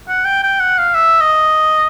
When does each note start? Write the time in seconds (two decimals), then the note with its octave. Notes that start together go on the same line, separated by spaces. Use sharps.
0.09 F#5
0.25 G5
0.43 G5
0.60 F#5
0.78 F5
0.95 E5
1.20 D#5